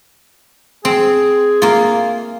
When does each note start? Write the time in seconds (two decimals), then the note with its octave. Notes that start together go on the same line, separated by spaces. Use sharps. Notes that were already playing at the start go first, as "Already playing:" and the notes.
0.85 C4 G#4
1.62 A#3 F4